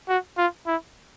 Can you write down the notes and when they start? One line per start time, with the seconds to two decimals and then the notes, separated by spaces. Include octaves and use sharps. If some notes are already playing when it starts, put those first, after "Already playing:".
0.09 F#4
0.38 F4
0.67 E4